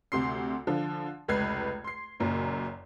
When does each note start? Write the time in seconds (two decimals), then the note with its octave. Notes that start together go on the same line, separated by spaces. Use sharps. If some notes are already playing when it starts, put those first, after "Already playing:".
0.12 D2 C3 C6 C7
0.67 D3 F3
1.28 F1 C#2 B4 G#6 C7
1.84 C6 C7
2.20 F#1 F#2 A#2